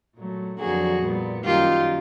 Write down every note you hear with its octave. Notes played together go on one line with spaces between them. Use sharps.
A#2 F#3 A3
F2 D3 F#3 A#3 F#4 G#4
A#2 G3 B3
F#2 D#3 G3 A#3 F4 G4